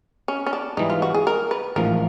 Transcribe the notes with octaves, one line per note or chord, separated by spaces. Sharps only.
C#4
C#4
D4
G#2 E3 G3 D#4
F4
F#4
G#4
A#4
B4
A1 G#2 F3 A#4